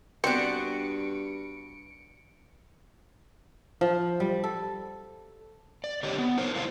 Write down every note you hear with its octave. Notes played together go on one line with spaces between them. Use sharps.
G2 B3 C4 D4 F#4 C#7 D7
F3
G3
A4
D5
D3 G4 C#5 D#5
B3
D#4 A#4 C5 C#5
E4 A4 C5 D5 F5